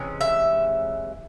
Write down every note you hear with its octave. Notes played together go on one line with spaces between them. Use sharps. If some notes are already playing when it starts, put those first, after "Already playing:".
Already playing: C3 E3 G#3 C#4
E5